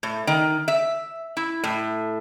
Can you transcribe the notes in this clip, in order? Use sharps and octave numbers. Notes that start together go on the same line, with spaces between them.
A2
D#3
E5
E4
A2